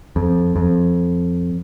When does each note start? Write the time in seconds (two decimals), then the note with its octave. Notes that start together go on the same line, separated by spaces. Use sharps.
0.16 F2
0.56 F2